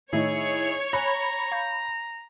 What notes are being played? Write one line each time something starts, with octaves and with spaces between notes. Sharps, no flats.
A2 D#3 A3 D#4 E4 G#4 C#5
G#5 A#5 B5 F#6
F5 C#6 G6